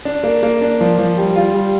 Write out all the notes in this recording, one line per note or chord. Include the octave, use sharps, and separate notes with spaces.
D4
A#3
A#3
D4
F3
F3
G3
F4
G3